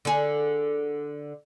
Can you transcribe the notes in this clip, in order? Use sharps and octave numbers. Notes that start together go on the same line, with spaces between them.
D3 G#4